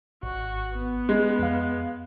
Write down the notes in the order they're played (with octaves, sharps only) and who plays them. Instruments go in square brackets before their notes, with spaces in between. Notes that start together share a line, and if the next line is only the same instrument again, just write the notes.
[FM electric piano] G#1 [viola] F#4
[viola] B3
[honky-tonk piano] G#3 [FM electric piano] F#6
[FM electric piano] F2 F5